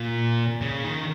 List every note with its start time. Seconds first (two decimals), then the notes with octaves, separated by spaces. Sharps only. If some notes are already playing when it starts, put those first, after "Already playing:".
Already playing: A#2
0.61 C#3
0.84 D#3